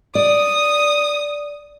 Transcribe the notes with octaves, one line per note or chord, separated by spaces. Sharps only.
D5 D#6